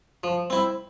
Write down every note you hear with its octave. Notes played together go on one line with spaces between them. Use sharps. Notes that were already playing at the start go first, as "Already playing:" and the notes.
F3
C4 E4